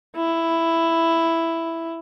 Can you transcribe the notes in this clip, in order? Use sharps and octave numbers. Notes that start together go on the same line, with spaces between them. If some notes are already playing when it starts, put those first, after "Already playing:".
E4